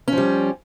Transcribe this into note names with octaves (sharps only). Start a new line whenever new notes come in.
F3 G3 C#4